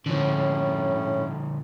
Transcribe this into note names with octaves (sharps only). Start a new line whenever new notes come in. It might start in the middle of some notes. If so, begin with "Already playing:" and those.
A2 D3 F3 C#4